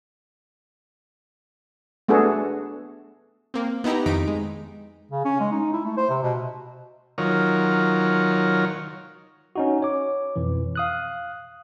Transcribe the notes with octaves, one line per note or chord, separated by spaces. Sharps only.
A3 B3 D4 F#4 G#4 A4
A#3 C4
B3 D#4 E4 G4 A#5
F2 D#3 D#4 B6 D7
G#3
C#3
C#4
G#3
D#4
E4
A3
C5
C3
B2
D#3 F#3 F4 A#4 C#5
C#4 D#4 F#4
C#5 D6
F2 B2 E3
F5 D#6 F#6